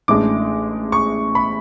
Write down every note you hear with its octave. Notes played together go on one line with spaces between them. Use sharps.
A1 A2 G#3 D4 D6
C#6
B5